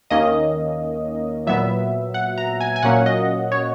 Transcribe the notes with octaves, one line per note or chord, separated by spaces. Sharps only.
D#2 D#3 A#3 C#4 D#5
A#2 F#3 B3 E5
F#5
A#5
G#5
G#5
A#2 F#3 A#3 C#4 F#5
D#5
C#5